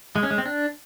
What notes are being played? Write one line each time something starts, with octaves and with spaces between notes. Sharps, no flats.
G#3
C#4
G#3
C4
D4